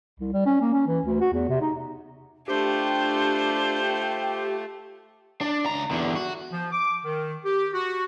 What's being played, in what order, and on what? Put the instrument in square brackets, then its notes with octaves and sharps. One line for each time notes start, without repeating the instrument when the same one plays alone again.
[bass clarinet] C2
G3
C#4
A#3
C#4
E3
D2
F#4
E2
C3
D#4
[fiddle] A3 F4 [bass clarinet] D4 [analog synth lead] G4 [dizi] C5
[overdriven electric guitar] D4
C#2 A#5
E2 D3
F#4
[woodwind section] F3
D6
D#3
G4
F#4